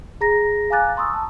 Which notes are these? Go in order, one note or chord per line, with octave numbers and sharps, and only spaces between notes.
G#4 A#5 A#6
F5 G#5 A#5 D6 F#6 A6
A#5 C6 C#6 D#6 E6
A5